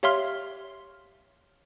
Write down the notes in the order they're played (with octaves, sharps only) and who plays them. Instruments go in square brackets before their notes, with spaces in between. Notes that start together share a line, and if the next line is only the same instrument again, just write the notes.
[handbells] G4 C#5 E5 F5 C6 F6